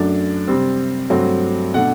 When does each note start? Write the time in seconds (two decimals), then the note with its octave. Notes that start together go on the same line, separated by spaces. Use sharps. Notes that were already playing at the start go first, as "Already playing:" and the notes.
Already playing: F#2 F#3 A3 D4
0.48 C3 G3 C4
1.10 G2 F#3 A3 C4
1.74 B2 A3 D4 F#5